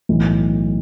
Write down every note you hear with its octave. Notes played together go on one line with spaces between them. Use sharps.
B1 A2 E3